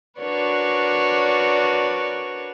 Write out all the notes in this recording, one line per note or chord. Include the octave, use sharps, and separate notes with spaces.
D4 F#4 A#4 B4 C#5 D5